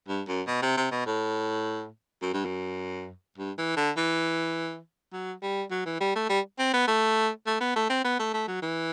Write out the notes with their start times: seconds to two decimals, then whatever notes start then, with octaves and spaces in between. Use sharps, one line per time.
0.08 G2
0.28 F#2
0.47 B2
0.62 C3
0.77 C3
0.91 B2
1.06 A2
2.22 F#2
2.34 G2
2.45 F#2
3.38 G2
3.58 E3
3.77 D3
3.97 E3
5.13 F#3
5.42 G3
5.71 F#3
5.86 E3
6.01 G3
6.15 A3
6.29 G3
6.59 C4
6.73 B3
6.88 A3
7.47 A3
7.60 B3
7.76 A3
7.90 C4
8.04 B3
8.19 A3
8.34 A3
8.48 F#3
8.62 E3